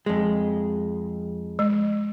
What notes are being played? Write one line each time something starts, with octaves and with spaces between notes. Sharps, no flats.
F2 G#3
G#3